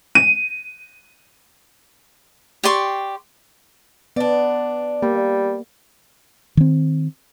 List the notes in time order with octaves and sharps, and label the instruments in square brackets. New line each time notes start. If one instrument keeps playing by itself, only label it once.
[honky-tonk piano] D#7
[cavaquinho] G4 D5 C6 C#6
[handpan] B3 [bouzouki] D4 D5
[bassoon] G3 [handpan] A#3
[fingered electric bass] D#3 C4